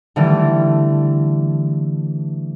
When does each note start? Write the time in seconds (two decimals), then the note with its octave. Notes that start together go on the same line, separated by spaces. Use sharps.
0.16 D3 E3 G3 A3